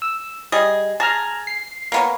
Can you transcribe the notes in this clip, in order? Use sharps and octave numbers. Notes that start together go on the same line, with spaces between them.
E6
G3 G#4 D#5
G#4 A5 A#5 F6
C7
A#3 B3 C#4